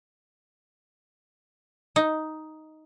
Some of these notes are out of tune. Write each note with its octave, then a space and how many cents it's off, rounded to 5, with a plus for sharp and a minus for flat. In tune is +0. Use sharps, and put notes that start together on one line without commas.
D#4 +5